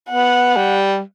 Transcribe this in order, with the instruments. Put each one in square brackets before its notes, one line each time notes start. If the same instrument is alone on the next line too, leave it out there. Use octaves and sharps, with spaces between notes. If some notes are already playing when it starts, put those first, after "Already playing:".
[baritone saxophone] B3 [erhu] F#5
[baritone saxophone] G3